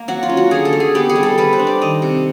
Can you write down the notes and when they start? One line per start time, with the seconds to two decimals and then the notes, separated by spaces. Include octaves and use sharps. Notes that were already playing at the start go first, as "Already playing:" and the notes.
Already playing: A#3
0.08 F#3 F#4
0.23 F4
0.29 C#4
0.37 F#4
0.51 D3 G#4
0.65 A4
0.73 A3
0.80 G#4
0.95 B3 G4
1.09 G#4
1.16 G3
1.23 A4
1.38 G3 B4
1.53 C5
1.59 D4
1.67 D5
1.81 D#3 D#5
2.02 C3